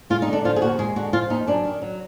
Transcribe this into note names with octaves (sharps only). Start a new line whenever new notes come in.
G#3 F4
D#4
D3 D4
F3 F4
G#4
D#2 F#4
G#3 G#4
D3 F#4
F3 F4
D#2 D#4
F#2 D4
D#3
F#3